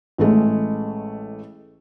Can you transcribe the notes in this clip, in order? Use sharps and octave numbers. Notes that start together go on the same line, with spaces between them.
A1 G#3 A3